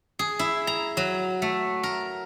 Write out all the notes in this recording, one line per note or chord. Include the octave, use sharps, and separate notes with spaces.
G#4
E4
A#5
F#3
A3
A#4